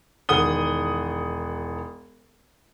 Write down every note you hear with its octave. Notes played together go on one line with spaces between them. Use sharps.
E1 D#3 F#5 D#6 G7